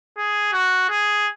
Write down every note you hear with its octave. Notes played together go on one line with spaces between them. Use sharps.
G#4
F#4
G#4